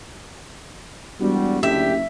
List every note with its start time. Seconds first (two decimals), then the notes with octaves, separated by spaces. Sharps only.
1.21 E1 G3 F#4
1.63 F#1 D2 D3 G4 E5